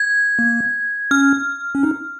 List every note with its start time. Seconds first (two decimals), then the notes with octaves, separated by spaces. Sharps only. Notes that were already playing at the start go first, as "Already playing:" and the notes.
Already playing: G#6
0.39 A#3
1.11 C#4 F6
1.75 C#4
1.83 D#4